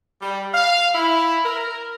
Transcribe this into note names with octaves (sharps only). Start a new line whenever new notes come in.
G3
F5
E4
A#4